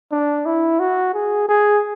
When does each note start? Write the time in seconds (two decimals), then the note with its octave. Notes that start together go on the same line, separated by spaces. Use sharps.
0.12 D4
0.46 E4
0.80 F#4
1.14 G#4
1.49 G#4